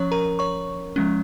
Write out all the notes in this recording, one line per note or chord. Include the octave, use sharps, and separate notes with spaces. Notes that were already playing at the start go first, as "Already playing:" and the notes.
Already playing: F3 C#4 C#5 C#6
A#4 A#5
C#5 C#6
F3 G#3 C#4